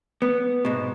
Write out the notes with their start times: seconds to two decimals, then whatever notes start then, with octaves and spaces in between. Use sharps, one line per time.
0.22 B3
0.65 G#2 B2